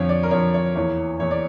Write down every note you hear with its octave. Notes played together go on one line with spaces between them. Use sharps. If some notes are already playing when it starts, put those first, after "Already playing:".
Already playing: F2 D3 F3 C#5
D5
A#4
F2 D3 F3 C#5
C#5
E2 E3 A#3 C#5
E2 E3 A#3 C#5
D5